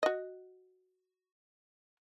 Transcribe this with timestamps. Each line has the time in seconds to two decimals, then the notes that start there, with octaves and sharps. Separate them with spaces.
0.03 F#4 D#5